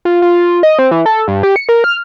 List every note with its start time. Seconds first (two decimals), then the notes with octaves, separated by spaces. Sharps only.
0.05 F4
0.22 F4
0.63 D#5
0.79 C4
0.91 E3
1.06 A4
1.28 G2
1.43 G4
1.56 C#7
1.69 A#4
1.84 F6